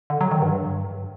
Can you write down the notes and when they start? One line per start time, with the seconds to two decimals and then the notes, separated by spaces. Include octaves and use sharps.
0.10 D3
0.21 F#3
0.31 D#3
0.42 G2